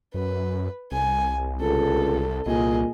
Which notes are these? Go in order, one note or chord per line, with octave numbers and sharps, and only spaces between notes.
F#2 B4
C2 G#5
C#2 A4
C2 A#2 G#4 D#5